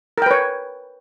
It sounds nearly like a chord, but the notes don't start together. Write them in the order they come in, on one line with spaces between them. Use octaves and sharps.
A#4 G5 B4 C#5